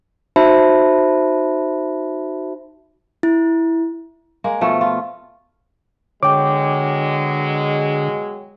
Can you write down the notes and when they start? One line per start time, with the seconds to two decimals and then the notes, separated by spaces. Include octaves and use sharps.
0.36 D#4 F#4 C5 E5 A5 B5
3.23 E4
4.44 G#3 A#3
4.61 B2 F3 A3
4.81 F4
6.23 B2 D3 F#3 G#3 C#5 G5 D6